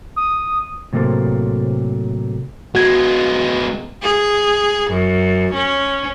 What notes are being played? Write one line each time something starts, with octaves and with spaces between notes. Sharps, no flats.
D#6
A2 C3 F#3 A#3 A4 C5
G#3 B3 F#4 G#6
G#4
F#2
C#4